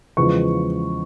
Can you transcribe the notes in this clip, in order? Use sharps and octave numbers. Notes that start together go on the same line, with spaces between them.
E2 C#3 F3 G#3 C#6